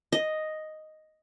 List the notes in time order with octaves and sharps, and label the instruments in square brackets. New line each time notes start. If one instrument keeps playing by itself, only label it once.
[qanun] D#5